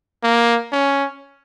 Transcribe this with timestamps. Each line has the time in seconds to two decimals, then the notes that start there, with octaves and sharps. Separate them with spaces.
0.23 A#3
0.72 C#4